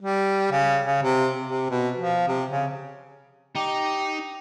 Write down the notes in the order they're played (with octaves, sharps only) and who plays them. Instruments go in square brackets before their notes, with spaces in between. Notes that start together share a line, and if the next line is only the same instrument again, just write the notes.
[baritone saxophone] G3
C#3
C#3
C3
C3
B2
F3
C3
C#3
[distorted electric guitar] D#4 [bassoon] G4